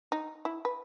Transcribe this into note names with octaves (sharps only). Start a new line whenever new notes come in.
D#4
E4
B4